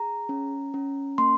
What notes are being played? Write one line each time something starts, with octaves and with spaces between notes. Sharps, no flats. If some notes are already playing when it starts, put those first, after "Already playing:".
Already playing: G#4 A#5
C#4
C#4
A#3 C6